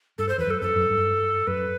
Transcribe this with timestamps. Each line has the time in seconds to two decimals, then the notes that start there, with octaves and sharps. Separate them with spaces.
0.18 G2 A4
0.29 C5
0.38 E2 B4
0.47 F#2 A4
0.61 F#2 A4
0.76 F#2
0.90 G2
1.47 F#2 B4